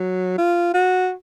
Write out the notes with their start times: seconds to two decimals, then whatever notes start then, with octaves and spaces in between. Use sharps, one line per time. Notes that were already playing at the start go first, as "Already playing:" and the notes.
Already playing: F#3
0.38 F4
0.74 F#4